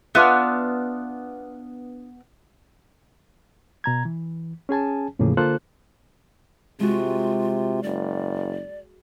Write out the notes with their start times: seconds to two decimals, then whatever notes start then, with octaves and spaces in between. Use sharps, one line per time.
0.15 B3 D4 F4 E5
3.84 B2 A#5 G#6
4.05 E3
4.69 C#4 G#4 G#5 A5
5.19 E2 A2 C#3 F3 A#3 G#4
5.37 D3 A#3 F4 A4 C5 F#6
6.80 C3 G#3 F4 F#4
7.83 F#1 D5